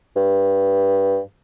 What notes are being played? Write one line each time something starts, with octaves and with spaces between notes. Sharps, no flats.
G2